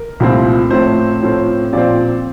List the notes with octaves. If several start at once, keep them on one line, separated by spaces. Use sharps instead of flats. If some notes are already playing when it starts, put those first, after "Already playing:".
Already playing: A#4
C2 A#2 F3 A3 C4
A2 F3 A3 C4 C5
A2 F3 A3 C4
A#2 F3 C4 D5